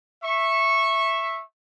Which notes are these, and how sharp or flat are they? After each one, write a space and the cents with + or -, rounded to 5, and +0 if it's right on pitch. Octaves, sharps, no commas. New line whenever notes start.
E5 +5 C#6 -15